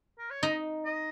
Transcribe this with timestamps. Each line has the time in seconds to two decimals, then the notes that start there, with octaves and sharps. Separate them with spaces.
0.19 A#4
0.30 C#5
0.43 D#4 D#5
0.85 D#5